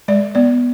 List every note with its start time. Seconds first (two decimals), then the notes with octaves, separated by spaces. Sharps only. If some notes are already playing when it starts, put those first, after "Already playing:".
0.08 G#3 D5
0.35 B3 D5